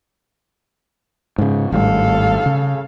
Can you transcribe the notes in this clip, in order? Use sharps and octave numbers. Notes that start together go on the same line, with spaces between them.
G#2 C#3
G#1 A2 G3 A4 F5
C#3